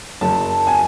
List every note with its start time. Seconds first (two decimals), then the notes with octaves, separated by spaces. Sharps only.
0.21 F#1 A5
0.67 G#5